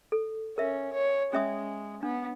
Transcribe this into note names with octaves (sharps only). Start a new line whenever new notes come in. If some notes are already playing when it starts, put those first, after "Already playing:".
A4
C#4 A#4 E5 F5
C#5
G#3 C#4 E5 D#6
B3 D4